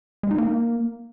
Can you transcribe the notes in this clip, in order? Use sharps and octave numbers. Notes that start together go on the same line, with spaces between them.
G#3
D#4
A#3